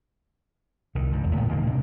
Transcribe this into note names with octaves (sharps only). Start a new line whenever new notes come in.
C2 D#3
C#2 G2
F1 E2 B3
A1 A2 D#3 B3
D#1 G#2 D3 A#3
D2 C3 G#3 D4